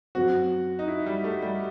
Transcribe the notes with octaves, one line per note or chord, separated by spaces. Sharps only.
F#2 F#3 C4 F#4
D#4
E4
G3
A3
G3